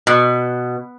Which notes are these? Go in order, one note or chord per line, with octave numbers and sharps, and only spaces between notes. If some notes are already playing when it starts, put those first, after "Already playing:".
B2